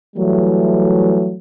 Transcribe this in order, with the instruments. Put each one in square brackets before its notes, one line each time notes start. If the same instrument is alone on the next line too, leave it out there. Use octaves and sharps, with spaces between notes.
[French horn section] E3 F#3 G3 A3